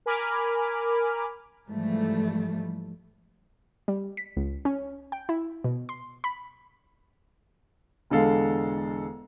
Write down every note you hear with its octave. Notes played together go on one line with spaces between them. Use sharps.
A#4 G#5 B5 D6 F6
G#2 E3 F3 G3 A3
G3
B6
C#2
C#4
G5
E4
B2
C6
B5
E1 D3 G#3 A4 F5